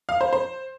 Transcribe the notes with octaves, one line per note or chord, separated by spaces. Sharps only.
F5
C5
C5